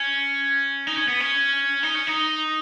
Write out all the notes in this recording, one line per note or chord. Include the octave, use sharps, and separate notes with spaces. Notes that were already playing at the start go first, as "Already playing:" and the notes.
Already playing: C#4
D#4
C#4
B3
C#4
D#4
C#4
D#4